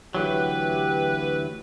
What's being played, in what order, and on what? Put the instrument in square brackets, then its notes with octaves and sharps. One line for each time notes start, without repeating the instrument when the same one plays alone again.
[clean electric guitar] D2 E3 F#3 [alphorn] G4 [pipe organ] B4